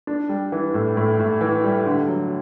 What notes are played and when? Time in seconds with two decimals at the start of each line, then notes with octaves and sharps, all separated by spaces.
0.07 D4
0.29 G3
0.52 E3
0.74 A2
0.97 A2
1.19 A2
1.41 E3
1.64 G3
1.86 D3
2.08 F#3